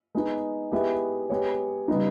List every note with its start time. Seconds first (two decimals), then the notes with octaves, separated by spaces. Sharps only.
0.15 G#3 B3 D#4
0.71 G#3 B3 E4 G4
1.30 G#3 B3 G4 C#5
1.88 C#3 G3 B3 D#4